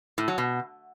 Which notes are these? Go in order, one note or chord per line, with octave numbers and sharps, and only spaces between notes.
A2
F#3
B2